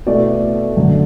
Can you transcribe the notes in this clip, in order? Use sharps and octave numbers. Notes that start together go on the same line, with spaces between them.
B2 A3 E4 D5
F#2 D3 A3